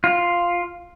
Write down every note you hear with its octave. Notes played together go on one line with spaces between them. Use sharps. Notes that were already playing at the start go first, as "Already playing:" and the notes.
F4